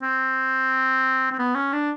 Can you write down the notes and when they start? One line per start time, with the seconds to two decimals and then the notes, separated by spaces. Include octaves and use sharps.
0.03 C4
1.32 C4
1.39 B3
1.55 C#4
1.73 D4